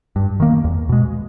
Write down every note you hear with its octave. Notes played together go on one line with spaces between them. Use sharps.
G2
D#3 A#3
E2
B2 G#3